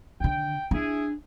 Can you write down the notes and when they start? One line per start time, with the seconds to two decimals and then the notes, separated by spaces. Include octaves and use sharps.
0.20 D3 D#3 G5
0.71 D4 E4 G#4